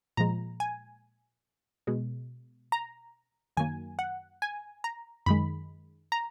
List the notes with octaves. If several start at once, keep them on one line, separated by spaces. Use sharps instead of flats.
A#2 F3 G#3 A#5
G#5
B2 G#3
A#5
F#2 D#3 F#3 A#3 G#5
F#5
G#5
A#5
F#2 D#3 G#3 B5
A#5